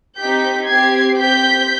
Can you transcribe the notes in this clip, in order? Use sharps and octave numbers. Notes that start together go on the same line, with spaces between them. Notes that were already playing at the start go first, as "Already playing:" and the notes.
C4 D#4 G4 G6 B6
C4 G4 G#6 C7
C4 G4 G6 B6